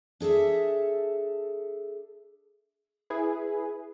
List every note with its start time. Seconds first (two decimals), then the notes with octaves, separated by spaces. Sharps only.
0.20 D4 G#4 A4 E5
3.10 E4 G#4 B4